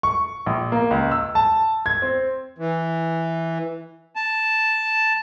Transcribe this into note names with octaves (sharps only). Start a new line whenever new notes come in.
C#6
A#1
A#3
C#2
E6
A5
G#6
C4
E3
A5